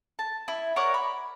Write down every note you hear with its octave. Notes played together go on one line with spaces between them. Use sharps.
A5
E4
A#4 C#5 D5 F#5
B5